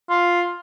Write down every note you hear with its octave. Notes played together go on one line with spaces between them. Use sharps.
F4